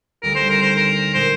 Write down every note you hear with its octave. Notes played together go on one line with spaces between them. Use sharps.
D2 D3 G3 C4 D#4 A#4
C5
A#4
C5
A#4
A#2 G#3 C5